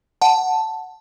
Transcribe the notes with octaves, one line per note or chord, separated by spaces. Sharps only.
F#5 A5